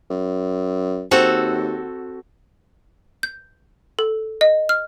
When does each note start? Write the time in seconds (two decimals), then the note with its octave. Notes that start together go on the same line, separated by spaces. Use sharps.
0.10 F#2
1.11 D#2 C4 F#4 A4
3.23 G6
3.99 A4
4.41 D#5
4.69 F6